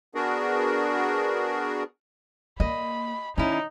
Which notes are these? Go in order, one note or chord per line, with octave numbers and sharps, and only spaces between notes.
B3 D4 F#4 G#4 A#4
A#3 D#5 B5
D#3 C#4 D#4 E4